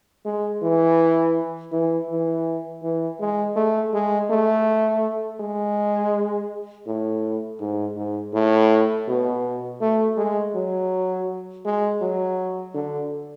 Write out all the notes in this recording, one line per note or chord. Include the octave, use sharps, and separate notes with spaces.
G#3
E3
E3
E3
E3
G#3
A3
G#3
A3
G#3
A2
G#2
G#2
A2
B2
A3
G#3
F#3
G#3
F#3
D3